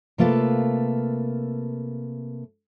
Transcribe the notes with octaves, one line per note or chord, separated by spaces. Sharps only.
C3 A3 A#3 F4 A4 B4